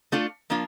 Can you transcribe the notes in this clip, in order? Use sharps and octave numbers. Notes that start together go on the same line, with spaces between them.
A3 D4 F4 A4
F3 A#3 D4 F4